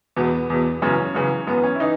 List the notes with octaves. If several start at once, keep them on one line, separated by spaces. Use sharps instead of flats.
E2 B2 B3
E2 B2
F#2 C#3 E3 C#4
F#2 C#3 E3
F#2 E3 B3
C#4
E4
E3 D#4